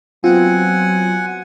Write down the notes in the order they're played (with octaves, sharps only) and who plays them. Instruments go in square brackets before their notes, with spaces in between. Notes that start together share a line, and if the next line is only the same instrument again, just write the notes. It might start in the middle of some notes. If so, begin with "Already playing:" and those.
[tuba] F#3 [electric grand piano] B3 C4 [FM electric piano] F4 [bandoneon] F#5 G#5